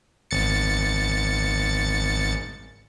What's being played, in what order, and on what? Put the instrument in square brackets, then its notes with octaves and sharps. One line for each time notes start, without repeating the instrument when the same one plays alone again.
[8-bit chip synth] G#1 A6 C#7